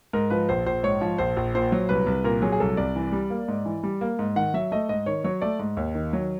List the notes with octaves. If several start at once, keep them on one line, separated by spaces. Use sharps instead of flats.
G#2 A#4
F3 B4
A#1 C5
A#1 C5
G#2 C#5
F3
A#1 C5
A#1
A#2 C5
F#3
C2 B4
C2
A#2 A#4
F#3 G#4
G#4
C2 A4
C2 D5
E3
G3
A#3
G#2
E3
G3
A#3
G#2
D#3 F#5
F#3 E5
A3 D#5
G#2 D#5
D#3 C#5
F#3 C#5
A3 D5
G#2
D#2
D#3
F#3